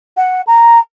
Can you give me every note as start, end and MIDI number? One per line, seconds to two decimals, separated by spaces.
0.17 0.41 78
0.47 0.79 82